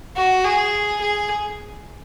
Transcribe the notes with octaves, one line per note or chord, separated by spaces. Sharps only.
F#4
G#4
G#4